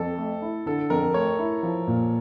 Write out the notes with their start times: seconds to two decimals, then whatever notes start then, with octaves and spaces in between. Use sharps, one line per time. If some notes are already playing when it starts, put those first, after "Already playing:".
Already playing: F2 A4
0.18 A3
0.42 E4
0.66 D3 A4
0.90 F2 A#4
1.14 A3 C#5
1.39 E4
1.63 F3
1.87 A#2